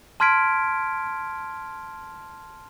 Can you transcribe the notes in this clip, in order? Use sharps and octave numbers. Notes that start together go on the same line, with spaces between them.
A5 C6 F6 G#6 B6 D7